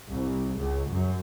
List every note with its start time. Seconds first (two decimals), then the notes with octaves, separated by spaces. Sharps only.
0.11 C2
0.59 C#2
0.89 F#2